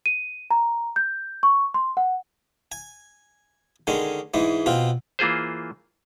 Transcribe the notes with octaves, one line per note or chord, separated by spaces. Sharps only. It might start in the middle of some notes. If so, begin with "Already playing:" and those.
D#7
A#5
G6
C#6
C6
F#5
G#5
D3 D#3 G#3 C#4
G#2 E3 G#3
B2 C4 F4
E3 A#3 F4 G#4 C5